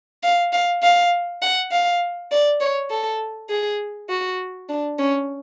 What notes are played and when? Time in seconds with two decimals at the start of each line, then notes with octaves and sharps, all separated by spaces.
0.23 F5
0.53 F5
0.83 F5
1.42 F#5
1.72 F5
2.31 D5
2.61 C#5
2.91 A4
3.50 G#4
4.09 F#4
4.69 D4
4.99 C#4